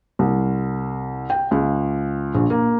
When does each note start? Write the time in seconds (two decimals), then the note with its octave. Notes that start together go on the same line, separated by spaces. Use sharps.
0.19 C2
1.30 G5
1.51 C#2
2.34 A#1
2.50 A#3